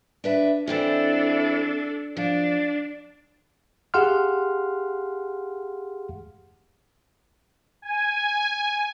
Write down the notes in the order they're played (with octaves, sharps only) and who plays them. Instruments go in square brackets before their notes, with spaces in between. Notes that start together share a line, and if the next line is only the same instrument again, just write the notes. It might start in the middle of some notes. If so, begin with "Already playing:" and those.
[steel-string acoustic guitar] D4 B4 E5
[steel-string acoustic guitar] E3 C4 E4 [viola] D4 A4
[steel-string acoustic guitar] F3 [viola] D4
[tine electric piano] G4 G#4 F5 F#5 C6 F6
[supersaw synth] G#5